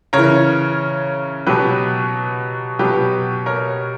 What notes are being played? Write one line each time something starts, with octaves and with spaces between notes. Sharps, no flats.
C#3 A#4 C#5
E3
B2 F#3 G4 B4
B2 F#3 G4 B4
A#4 C#5